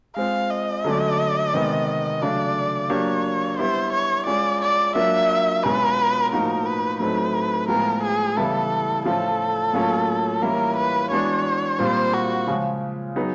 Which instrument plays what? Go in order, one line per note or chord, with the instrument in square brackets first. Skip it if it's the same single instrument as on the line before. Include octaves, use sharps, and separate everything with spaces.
[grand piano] G#3 C4 F4 [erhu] F5
[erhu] D#5
[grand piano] D3 F#3 A3 C#4
C3 D#3 G#3 B3
[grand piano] C#3 F#3 A3 D4 [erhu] D5
[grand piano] F#3 A#3 D4 G4 [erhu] C#5
[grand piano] G3 B3 E4 G4 [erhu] C5
[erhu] C#5
[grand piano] G#3 C#4 F4 G#4 [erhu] D5
[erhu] D5
[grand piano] F#3 A#3 D4 F4 A#4 [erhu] E5
[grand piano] B2 G#3 C#4 F4 [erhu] B4
[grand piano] A2 F3 A#3 D#4 F#4 [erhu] A#4
[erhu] B4
[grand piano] A2 F#3 A3 C4 D#4 [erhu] B4
[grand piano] A2 F3 G#3 B3 [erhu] A#4
[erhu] G#4
[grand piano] C#3 E3 G3 B3 E4 [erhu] A4
[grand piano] A2 F3 A3 C#4 F4 [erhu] A4
[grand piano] A2 F#3 A#3 C#4 F4
[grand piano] E3 G3 A#3 C#4 E4 [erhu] A#4
[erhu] B4
[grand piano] E3 G#3 B3 D4 F#4 [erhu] C#5
[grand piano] A#2 G3 C4 F4 [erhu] C5
[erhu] F#4
[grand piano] C#3 F3 G#3
F#3 B3 D#4 G#4 B4